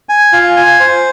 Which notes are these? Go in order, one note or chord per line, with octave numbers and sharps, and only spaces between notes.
G#5
F4
G#5
C5